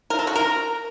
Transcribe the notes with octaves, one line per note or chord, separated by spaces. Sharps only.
A#4
A4
F#4
A#4